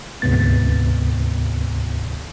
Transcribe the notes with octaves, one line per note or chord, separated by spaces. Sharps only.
D2 G#2 C3 B3 A6